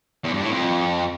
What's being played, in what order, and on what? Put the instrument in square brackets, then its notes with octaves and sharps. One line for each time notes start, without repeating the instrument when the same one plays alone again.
[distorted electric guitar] E2
G2
A2
F2